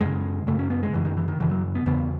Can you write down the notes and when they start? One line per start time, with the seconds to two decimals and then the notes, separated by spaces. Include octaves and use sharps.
0.01 F#2 C#3 G#3
0.47 F#2 C#3 A3
0.59 C#4
0.70 B3
0.83 G#3
0.93 F#2 C#3 E3
1.05 D#3
1.17 E3
1.28 D#3
1.40 F#2 C#3 E3
1.51 F#3
1.75 B3
1.86 E2 C#3 B3